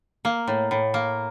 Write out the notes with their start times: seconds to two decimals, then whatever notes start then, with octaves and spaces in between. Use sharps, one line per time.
0.25 A#3
0.48 A2
0.71 A2
0.94 A#3